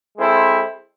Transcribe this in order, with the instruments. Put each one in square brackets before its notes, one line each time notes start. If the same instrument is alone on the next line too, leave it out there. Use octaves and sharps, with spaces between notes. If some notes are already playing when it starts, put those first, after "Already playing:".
[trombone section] G#3 C4 E4 A4 C5